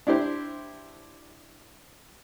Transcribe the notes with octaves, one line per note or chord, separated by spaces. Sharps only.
D4 E4 G4 C5